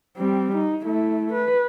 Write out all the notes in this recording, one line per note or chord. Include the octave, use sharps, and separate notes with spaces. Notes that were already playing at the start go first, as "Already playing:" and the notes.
G3 C4
D#4
A3 E4
B4